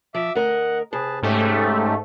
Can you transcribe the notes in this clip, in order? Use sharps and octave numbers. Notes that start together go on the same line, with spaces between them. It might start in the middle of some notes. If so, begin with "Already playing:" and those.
F3 E5 D6 E6
D2 A#4 D#5 F#5
C3 G#4 B4 A5
G#2 A3 C#4 G4